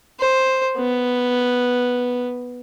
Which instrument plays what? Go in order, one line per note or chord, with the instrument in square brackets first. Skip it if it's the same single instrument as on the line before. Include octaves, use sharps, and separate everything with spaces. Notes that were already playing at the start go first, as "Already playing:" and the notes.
[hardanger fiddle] C5
B3